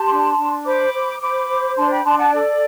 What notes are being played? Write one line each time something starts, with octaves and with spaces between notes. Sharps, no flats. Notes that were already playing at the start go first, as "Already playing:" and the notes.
Already playing: G4 A5 C6
D4
D4
C5 B5 D6
C5
C5 B5 D6
C5
D4 A5 C6
G5 B5
D4 A5 C6
F#5 A5
A4 D5